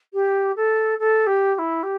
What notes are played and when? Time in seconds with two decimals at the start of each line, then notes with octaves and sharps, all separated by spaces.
0.13 G4
0.56 A4
0.99 A4
1.27 G4
1.55 G4
1.58 E4
1.83 G4